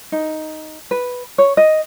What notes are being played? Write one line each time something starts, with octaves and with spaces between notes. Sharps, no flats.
D#4
B4
C#5
D#5